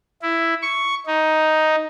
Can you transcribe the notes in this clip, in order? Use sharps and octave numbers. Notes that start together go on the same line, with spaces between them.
E4
C#6
D#4